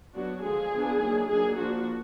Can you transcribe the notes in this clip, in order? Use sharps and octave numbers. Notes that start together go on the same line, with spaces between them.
F#3 B3 D4 F#4
D3 F3 G#3 G#4
F3 B3 D4
D#3 F#3 A#3 D4
F#3 A#3 D4 G#4
F3 A#3 D4 F#4